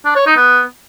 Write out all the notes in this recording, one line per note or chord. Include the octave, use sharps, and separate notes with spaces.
D4
C#5
D#4
B3